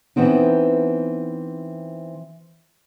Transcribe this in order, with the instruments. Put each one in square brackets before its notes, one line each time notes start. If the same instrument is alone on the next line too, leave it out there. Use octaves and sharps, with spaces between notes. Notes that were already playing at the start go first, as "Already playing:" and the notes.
[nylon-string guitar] E3 B3 C4 D#4